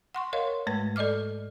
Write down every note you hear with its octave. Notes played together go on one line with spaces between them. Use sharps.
F#5 C6 C#6
A#4 C#5 D#5 F5 C6
G#2 G#3 A3 B4 G#6
A4 D5 D#5 D6 F6